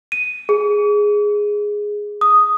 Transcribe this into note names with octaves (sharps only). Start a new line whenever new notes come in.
D#7
G#4
D#6